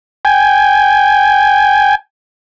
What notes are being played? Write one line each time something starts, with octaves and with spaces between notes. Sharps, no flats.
G5 G#5